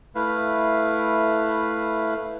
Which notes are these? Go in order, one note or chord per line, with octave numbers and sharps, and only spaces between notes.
A3 E4 B4 F5